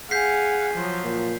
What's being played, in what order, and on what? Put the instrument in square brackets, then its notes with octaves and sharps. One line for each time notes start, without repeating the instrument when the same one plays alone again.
[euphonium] G#4 [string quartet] F5 F#5 G#5 [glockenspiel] G6 B6 C7
[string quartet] F3 F#3
[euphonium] A#2